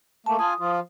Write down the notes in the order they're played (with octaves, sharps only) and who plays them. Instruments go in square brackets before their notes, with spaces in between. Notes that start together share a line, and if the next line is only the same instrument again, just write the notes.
[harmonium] A3 A#3 [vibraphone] A5
[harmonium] F4 G#5 [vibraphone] D#6
[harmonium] F3 F4